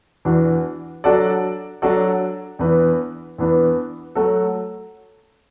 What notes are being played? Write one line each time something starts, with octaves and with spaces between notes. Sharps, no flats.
E2 E3 D4 F#4
F#3 D4 F#4 A4 D5
F#3 D4 F#4 A4 D5
E2 E3 B3 D4 B4
E2 E3 B3 D4 B4
F#3 A3 F#4 A4